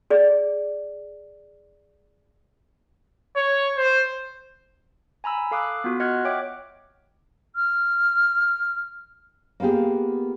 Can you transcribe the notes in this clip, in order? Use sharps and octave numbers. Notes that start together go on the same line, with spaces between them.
G#4 D5
C#5
C5
G#5 A#5 B5 E6
A4 F5 D6 D#6 F#6
B3 F4 F#4
D#5 F#5 F6 F#6 G#6
C#5 E5 G5 D6
F6
A#3 B3 F4 G4 G#4